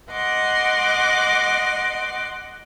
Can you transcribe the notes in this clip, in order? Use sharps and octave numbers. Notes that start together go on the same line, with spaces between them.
D#5 F#5 C6 D6